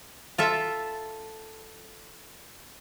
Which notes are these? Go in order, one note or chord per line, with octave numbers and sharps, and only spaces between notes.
F4 A4 E5